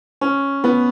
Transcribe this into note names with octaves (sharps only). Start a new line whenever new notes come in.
C#4
B3